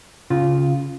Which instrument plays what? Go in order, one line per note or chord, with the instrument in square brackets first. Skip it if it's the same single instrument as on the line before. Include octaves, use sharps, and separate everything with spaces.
[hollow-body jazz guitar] C#3 F4